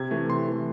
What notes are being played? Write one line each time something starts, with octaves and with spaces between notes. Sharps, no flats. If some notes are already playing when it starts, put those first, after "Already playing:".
Already playing: C3 G#6
E3 A3
C3 C6
E3 A3